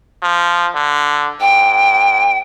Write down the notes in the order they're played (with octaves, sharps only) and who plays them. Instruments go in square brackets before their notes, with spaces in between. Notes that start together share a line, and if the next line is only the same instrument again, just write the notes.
[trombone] F3
D3
[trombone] G#2 [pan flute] G5